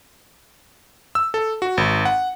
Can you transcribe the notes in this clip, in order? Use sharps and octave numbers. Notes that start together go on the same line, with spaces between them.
E6
A4
F#4
G#1
F#5